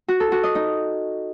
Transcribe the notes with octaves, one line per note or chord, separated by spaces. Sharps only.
F#4
A4
F#4
D#5
D#4